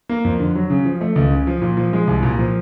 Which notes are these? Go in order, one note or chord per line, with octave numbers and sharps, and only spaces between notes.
A#3
F2
D3
F#3
C#3
F3
A3
C#2
C#3
F3
A#2
F3
G#3
C2
A#2
F3